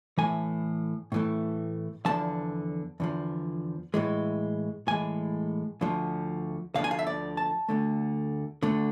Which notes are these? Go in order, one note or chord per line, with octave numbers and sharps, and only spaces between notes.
A2 E3 A3 G#5
A2 E3 A3
E2 D3 F3 A5
E2 D3 F3
A2 E3 G#3
A2 E3 G#3 G#5
D2 D3 F3
D2 D3 F3 F5
G#5
F5
E5
D5
A5
D2 D3 A3
D2 D3 A3